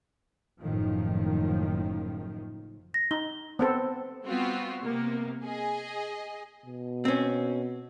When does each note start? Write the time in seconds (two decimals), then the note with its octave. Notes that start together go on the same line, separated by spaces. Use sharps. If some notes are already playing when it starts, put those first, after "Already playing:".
0.61 F#1 A2 D#3 F3
2.94 A#6
3.11 D#4 G7
3.59 B3 C4 A4 C5
4.26 G3 B3 C4 F4 F#4
4.83 C3 A#3 B3
5.44 G#4 D#5
6.66 B2
7.05 C4 C#4